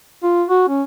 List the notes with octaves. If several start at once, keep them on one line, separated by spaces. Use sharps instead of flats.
F4
F#4
C#4